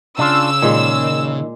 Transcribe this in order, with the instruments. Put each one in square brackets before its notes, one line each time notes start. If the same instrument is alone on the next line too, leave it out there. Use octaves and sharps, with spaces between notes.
[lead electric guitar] C#3 [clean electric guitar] D4 F4 [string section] E6
[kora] A#2 G#3 [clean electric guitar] D#3